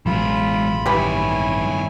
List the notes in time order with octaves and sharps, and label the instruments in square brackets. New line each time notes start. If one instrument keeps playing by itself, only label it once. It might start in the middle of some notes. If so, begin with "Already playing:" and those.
[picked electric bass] A1 B2 F#3 [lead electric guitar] E3 G#3 [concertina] F4 B5
[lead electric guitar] G2 D#3 [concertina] E4 C#5 G#5 [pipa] G4 B4 B5